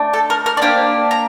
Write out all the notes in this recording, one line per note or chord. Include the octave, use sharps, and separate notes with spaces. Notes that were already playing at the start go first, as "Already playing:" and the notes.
Already playing: A3 D4
A4
A#4
A#4
D5
A#3 D4 G4 C5
A#5